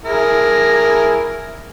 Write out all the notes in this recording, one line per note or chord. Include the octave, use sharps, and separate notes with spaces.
E4 G#4 A#4